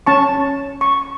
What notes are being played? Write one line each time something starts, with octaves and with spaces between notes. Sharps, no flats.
C#4 A5 C#6
C#6